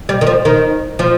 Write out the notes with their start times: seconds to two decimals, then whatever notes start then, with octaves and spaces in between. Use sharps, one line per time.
0.09 G3
0.21 D#3
0.27 F3
0.45 D#3
0.99 F3